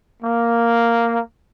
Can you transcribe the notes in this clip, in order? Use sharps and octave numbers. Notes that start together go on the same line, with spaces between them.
A#3